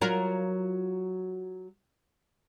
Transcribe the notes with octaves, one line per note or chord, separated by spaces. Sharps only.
F#3 F4 A#4